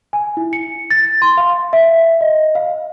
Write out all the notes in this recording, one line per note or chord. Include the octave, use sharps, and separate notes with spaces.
G#5
E4
C#7
A6
C6
F5
E5
D#5
F5